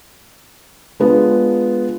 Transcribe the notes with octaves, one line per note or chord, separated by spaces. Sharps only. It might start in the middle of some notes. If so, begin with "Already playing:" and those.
G#3 B3 D4 F4